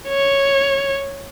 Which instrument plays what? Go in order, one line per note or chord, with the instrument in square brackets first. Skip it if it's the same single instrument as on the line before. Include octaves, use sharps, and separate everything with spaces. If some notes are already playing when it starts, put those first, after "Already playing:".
[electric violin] C#5